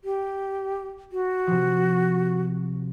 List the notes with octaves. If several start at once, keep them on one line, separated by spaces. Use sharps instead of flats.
G4
F#4
C3 F3